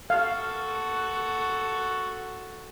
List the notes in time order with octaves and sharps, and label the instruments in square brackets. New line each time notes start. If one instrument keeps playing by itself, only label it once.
[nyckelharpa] F#4 A4 [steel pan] F5